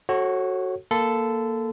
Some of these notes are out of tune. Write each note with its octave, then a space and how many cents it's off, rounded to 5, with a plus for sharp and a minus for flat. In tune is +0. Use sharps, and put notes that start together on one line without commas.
F#4 +10 A4 +0 C#5 -30
A#3 +0 A4 +0 C6 -45